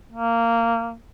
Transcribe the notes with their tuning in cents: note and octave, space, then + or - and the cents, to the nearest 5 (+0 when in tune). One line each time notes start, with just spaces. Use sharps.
A#3 -15